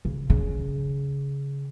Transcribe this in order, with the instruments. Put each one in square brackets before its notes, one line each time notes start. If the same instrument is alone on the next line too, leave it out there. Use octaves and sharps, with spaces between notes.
[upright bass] C#3
C#3